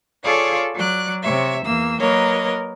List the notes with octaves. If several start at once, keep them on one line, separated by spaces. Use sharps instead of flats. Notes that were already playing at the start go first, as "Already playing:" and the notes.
F4 G#4 A4 C#5 D5 F5
F#3 D5 F#6
C3 C#5 E5
E2 A#3 E6
F#3 A#3 A#4 B4 C#5 D#5